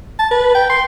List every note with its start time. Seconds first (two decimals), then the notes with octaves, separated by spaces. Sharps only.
0.19 A5
0.31 B4
0.54 G5
0.70 C6